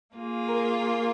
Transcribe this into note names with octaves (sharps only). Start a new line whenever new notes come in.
A#3 F4 G#4
A#4
A#4